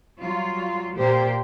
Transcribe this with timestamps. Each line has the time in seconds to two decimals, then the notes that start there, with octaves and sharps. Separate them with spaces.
0.19 F#3 G3 F4
0.98 A#2 A#3 G4 C5